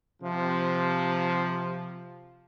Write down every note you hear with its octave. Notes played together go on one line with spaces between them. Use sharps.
C3 F3